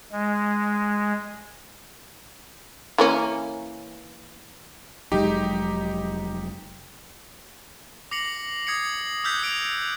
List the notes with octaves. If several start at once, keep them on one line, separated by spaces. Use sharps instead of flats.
G#3
E3 A#3 C#4
F1 F#3 G#3 D#4 G4
D6 A#6 C7 C#7 F#7
D#6 G#6 C7 C#7
D6 E6 F#6 G6 B6
D#6 D7 F7